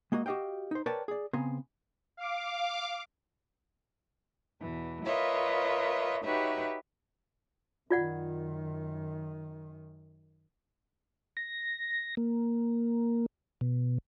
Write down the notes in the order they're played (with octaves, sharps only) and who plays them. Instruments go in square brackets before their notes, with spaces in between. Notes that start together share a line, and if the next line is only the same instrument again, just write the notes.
[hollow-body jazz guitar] G#3 A#3 F#4 D#5
F#4 G4 D#5 F5 G5
D#4 C5
A#4 B4 C#5 D5 G5 A5
G#4 D5
C#3 B3 C4 G#5 A#5 C6
[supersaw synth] F5 D6
[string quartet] E2 B2 E3
F4 A#4 B4 C#5 D#5 E5
D#4 F#4 G4 B4 C#5 E5
[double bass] F#2 D#3 [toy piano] F4 D5 F#5
[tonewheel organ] A#6
A#3
B2